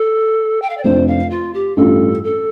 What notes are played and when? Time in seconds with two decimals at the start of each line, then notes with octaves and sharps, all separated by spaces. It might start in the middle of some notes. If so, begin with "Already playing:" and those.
Already playing: A4
0.62 G5
0.70 F5
0.78 D5
0.84 F1 F2 F3 D4 F4 C5
1.08 F5
1.30 F4
1.54 G4
1.77 A1 G2 G3 F4 A4
2.24 A4